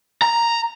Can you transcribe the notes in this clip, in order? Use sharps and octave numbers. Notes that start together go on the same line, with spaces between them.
A#5